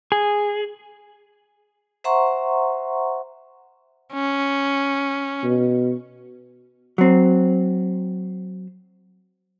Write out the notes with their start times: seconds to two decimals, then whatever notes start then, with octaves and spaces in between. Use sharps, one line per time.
0.12 G#4
2.04 C5 E5 F#5 A#5 C6 C#6
4.13 C#4
5.44 B2
6.98 F#3 C4